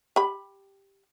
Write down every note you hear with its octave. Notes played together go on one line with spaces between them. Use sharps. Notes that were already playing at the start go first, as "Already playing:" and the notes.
G4 B5